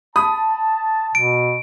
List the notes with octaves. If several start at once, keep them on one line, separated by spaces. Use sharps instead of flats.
A5 B5 D#6
B2 D7